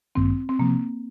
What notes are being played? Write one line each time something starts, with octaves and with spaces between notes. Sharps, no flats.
A1 G2 D#3 A#3 C4
C4
C3 F3 A#3 C4